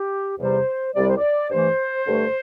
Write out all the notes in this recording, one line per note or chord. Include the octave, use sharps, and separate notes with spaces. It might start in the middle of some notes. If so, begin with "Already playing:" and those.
Already playing: G4
E2 C3 G3 C5
C2 C3 G3 D5
C5
D5
G2 E3 A3 C5
G2 D3 A3